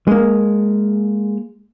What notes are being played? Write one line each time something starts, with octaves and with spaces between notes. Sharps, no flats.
G#3 A#3